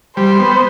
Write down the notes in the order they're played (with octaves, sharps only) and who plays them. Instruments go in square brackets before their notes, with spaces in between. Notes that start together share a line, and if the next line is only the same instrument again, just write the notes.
[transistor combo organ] G3 [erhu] C5
[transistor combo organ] B3